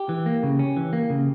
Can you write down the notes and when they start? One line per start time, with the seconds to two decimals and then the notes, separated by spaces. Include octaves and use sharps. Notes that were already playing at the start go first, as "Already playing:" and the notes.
Already playing: G4
0.09 E3
0.26 A#3
0.43 C#3
0.59 C#4
0.76 E3
0.93 A#3
1.10 C#3